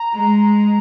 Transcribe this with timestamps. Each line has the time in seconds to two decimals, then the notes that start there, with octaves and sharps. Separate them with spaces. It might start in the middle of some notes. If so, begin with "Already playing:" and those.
Already playing: A#5
0.14 G#3